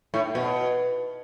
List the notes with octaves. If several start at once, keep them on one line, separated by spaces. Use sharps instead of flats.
A2
B2